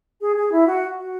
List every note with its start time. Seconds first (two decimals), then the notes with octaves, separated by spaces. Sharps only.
0.21 G#4
0.36 G#4
0.52 E4
0.67 F#4
0.98 F#4